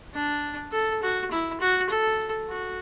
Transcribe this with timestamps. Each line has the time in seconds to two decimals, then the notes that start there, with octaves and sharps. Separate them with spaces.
0.14 D4
0.72 A4
1.02 F#4
1.31 E4
1.60 F#4
1.89 A4
2.49 F#4